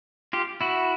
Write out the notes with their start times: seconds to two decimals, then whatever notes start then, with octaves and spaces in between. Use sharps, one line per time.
0.33 F4 G4
0.61 E4 F#4